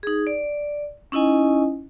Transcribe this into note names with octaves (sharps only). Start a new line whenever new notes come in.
D#4 G#4
D5
C#4 D#4 E4 D#5 G#5